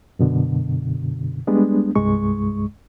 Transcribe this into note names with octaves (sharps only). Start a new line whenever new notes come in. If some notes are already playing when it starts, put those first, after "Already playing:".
F#2 B2 D3
G3 G#3 B3 D4
C2 G2 G#3 C#6